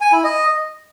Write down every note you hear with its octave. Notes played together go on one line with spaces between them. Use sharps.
G#5
E4
D#5